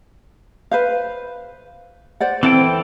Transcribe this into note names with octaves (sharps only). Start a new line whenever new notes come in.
B4 C5 F5
C5 D5 F#5
E3 C4 E4 A4 G5